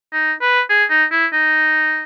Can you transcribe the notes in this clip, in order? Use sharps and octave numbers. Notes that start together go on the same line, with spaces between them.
D#4
B4
G#4
D#4
E4
D#4